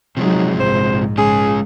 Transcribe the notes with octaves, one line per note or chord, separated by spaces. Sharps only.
C3 F3 F#3 G#3 D#4
A#1 G#2 C5
G#3 C#4 G#4